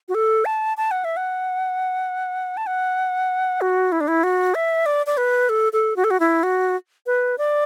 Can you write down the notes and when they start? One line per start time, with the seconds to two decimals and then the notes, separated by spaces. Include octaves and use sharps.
0.09 F#4
0.15 A4
0.45 A5
0.77 A5
0.91 F#5
1.04 E5
1.17 F#5
2.57 A5
2.67 F#5
3.61 F#4
3.92 E4
4.01 D4
4.08 E4
4.23 F#4
4.55 E5
4.86 D5
5.06 D5
5.17 B4
5.49 A4
5.73 A4
5.96 F#4
6.04 A4
6.10 F#4
6.20 E4
6.43 F#4
7.06 B4
7.38 D5